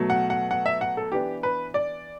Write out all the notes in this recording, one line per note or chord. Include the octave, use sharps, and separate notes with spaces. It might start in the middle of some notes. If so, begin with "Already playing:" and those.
Already playing: B2 F#3 A3
F#5
F#5
F#5
E5
F#5
A4
E3 B3 D4 G4
B4
D5